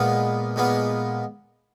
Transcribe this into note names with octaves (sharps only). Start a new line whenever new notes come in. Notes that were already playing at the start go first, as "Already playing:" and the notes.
Already playing: A#2 G#3 B3 F4
A#2 G#3 B3 F4